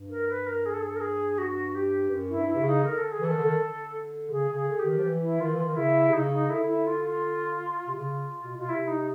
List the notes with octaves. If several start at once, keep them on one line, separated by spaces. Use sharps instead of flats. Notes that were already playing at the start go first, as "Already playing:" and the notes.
Already playing: G2
A#4
B4
A#4
G#4
A4
G#4
A4
A#4
G#4
F#4
G4
F#2
E4
G2
E4
C3
C#3
D#4
D3 A#4
A4
G#4
E3
D#3 A4
D3
D#3
D3
C#3 G#4
C#3
G#4
D3
G4
D#3
F3
E3
E4
D#3 F4
E3
F4
D#3
C#3 E4
C3
C#3 D#4
D#4
D3 E4
E4
F4
F4
C3
C#3 F4
B2
B2 F4
C3 E4
D#4